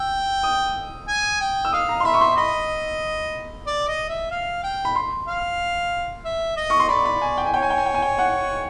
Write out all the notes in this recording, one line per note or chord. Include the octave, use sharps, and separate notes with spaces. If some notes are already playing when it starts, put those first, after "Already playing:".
Already playing: G5 E6
D#6
G#5
G5
E6
F5 D#6
A#5
C6
E5 B5
C#6
C6
D#5 B5
D5
D#5
E5
F5
G5
B5
C6
F5
E5
D#5
C#6
C6
D5 B5
B5
G#5
G5
G#5
C#5 G5
G#5
G5
G#5
G5
G#5
G5
F#5